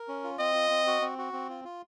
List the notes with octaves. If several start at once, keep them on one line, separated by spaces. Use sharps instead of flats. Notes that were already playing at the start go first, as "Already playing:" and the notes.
Already playing: A#4
C#4
F4
C4 D#5
F4
C4
F#4
C4
F#4
C4
F4
F4